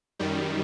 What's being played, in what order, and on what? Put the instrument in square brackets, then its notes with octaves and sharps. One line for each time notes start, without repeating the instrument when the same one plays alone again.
[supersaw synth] F#2 D#3 G3